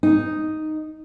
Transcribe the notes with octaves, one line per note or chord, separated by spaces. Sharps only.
D#4